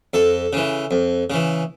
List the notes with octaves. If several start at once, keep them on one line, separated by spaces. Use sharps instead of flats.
F2 A4
C#3 E3
F2
C#3 E3